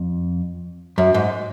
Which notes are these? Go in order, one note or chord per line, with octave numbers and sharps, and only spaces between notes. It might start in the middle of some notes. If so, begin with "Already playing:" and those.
Already playing: F2
F#2
G#2